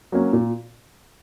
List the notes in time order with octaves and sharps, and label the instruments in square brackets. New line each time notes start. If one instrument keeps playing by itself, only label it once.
[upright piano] F#3 A#3 C#4
A#2